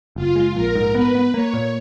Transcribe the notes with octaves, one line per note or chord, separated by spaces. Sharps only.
F#1 F4
G#3
A#1 A#4
G#2
B3 B4
B3
A#3 C#5
A#2